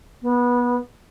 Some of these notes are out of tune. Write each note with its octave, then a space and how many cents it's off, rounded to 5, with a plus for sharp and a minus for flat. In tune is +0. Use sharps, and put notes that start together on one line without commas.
B3 -20